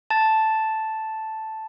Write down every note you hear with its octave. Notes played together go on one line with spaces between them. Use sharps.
A5 A6